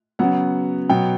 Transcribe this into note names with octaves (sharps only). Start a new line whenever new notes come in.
C#3 F#3 B3 F#5
B2 F#3 B3 G5